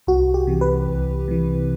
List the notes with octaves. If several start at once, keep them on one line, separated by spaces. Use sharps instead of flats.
C2 F#4
G4
C3 E3
B4
C2
C3 E3